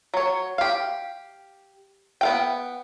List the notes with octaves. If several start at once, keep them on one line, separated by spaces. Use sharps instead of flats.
F#3 C#5
G4 F5
B3 F5 G5